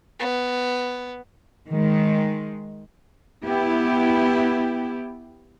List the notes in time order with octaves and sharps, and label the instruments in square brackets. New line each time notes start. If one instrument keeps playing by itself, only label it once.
[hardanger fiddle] B3
[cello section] D#3 G#3
B3 E4 G4